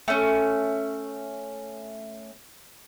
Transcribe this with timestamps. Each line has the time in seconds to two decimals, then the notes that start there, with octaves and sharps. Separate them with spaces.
0.08 A3 C#4